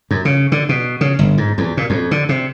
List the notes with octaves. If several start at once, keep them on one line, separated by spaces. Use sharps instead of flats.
F#2
C#3
D3
B2
C#3
G1
G#2
E2
A#2
F2
D3
C3